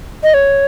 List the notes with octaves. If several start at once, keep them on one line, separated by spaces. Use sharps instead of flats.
D#5
C#5